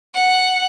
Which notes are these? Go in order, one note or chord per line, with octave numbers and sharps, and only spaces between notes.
F#5